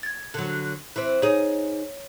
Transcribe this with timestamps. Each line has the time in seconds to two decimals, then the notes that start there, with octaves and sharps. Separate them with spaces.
0.03 G#6 A6
0.34 D3 F#3
0.96 E3 C4
1.22 D#4 G#4 C#5